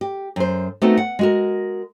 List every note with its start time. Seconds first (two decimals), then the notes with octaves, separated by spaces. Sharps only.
0.01 G4
0.36 F#2 C5
0.82 A3 B3 C4 D#4 F#4
0.97 F#5
1.19 G#3 F#4 A#4